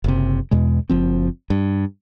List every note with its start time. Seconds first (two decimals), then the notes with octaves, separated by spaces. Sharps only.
0.04 F#1 C3
0.51 E2 B2 G#3
0.90 F#1 F3 C4
1.50 G2